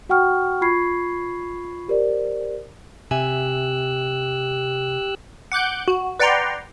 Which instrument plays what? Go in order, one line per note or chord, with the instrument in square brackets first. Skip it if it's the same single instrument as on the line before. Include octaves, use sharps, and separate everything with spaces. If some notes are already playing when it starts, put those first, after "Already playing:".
[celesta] F#4 F#5 G5 C#6 F6
F4 B5 C#6 G#6 C7
G4 A#4 C5 D5
[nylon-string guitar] C3 E5 G#5 [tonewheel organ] G4 E6 F#6
[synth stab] F#5 D6 F#6 G6
F#4
B4 D5 F#5 G5 A#5 C6